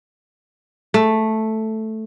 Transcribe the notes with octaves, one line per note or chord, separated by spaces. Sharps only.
A3